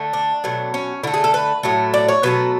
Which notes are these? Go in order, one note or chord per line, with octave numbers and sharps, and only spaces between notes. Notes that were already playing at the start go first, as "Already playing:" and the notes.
Already playing: D3 A3
D4
B2 F#3 A3
C#4
D3 A3 E4
G#4
A4
B4
A2 F#3 A3
D5
C#5
B2 F#3 A3 B4